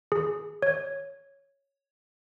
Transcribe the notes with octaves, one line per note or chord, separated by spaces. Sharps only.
G#4
C#5